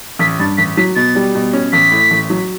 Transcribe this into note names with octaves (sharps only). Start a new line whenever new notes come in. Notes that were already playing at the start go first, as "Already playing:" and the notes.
A1 B6
G2 A6
A1 B6
F#3 B6
B2 A6
G3
B2
C#4
A1 B6
A2
A1
F#3